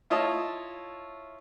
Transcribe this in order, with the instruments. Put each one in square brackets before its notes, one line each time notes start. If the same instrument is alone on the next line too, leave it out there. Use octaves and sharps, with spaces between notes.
[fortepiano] E4 F4 C#5 D#5 A5